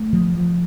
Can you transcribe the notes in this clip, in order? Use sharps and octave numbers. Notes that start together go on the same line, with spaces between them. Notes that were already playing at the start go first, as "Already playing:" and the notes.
Already playing: A3
F3
F3